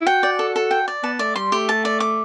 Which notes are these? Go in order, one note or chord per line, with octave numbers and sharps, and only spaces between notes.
E4
F#4 G5
D5
A4
A4
G5
D5
B3 A5
A3 D5
G3 C6
A3 G4
A5
D5
D6